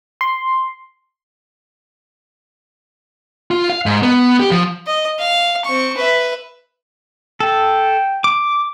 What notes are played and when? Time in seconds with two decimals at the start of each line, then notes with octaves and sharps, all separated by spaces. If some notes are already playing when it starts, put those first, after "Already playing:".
0.21 C6
3.51 F4
3.70 F5
3.86 G#2
4.03 B3
4.40 G4
4.51 F3
4.87 D#5
5.19 F5
5.65 C4 C#6
5.97 B4 E5
7.40 A4 G5
8.24 D6